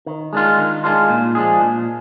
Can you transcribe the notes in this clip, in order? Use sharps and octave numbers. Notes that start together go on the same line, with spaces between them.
D#3
G#3 D4 F4
D#3
G#3 D4 F4
A#2
F3 G#3 D4 G#4
A#2